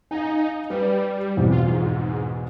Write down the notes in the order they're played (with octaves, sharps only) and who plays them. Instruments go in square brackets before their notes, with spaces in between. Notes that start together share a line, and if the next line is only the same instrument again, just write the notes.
[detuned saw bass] D#4 [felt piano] F5 G#5
[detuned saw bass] G3 [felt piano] B4
[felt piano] E2 B2 C4
[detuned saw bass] F4
G#2